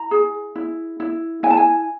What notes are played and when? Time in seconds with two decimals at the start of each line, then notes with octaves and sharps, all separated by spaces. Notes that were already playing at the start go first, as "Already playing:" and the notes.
Already playing: E4 A#5
0.11 G#4
0.55 E4
1.00 E4
1.43 E4 G#5
1.50 A5
1.57 G#5